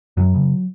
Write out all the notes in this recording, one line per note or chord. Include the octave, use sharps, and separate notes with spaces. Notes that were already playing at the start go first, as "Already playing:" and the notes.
F#2 F#3
C#3